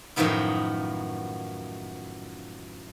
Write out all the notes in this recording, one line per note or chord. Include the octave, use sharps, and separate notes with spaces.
F#2 A2 D#3 F3 B3 D#4